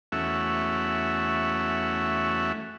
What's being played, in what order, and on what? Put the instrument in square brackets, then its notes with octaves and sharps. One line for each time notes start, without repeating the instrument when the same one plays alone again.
[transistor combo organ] E2 A3 C#4 F#4 E5